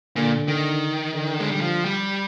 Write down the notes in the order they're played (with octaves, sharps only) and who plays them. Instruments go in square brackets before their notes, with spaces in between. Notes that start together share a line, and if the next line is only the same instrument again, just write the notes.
[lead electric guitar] A#2 [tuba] D3
[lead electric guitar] D#3
[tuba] D3
[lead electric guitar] G#3
G3
F3
G3